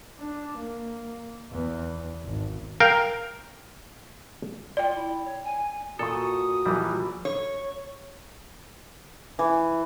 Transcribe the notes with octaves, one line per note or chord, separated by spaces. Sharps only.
D4
A#3
E2
G#1
A#4 F5 G5
F4 D5 G5
E4
C#5
G#5
A#2 F#4 A4 C#6 D#6
A#1 E3 F#3 G3
C#5
E3